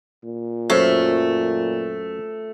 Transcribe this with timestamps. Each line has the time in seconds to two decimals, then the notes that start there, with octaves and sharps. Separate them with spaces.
0.24 A#2
0.70 F#2 A3 F4 C5 C#5 E5